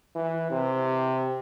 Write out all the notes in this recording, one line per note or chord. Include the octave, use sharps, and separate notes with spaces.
E3
C3